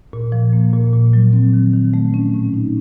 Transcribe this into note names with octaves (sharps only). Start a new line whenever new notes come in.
A#2
F3
A#3
A#2
A#2
F#3
C4
D#3
D#3
A3
C#4
A2
D#4